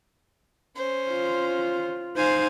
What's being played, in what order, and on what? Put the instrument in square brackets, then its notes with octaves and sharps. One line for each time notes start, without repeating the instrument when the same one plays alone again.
[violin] C#4 C5
[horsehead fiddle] F4
[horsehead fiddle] D#4 C5 [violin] F5 G#5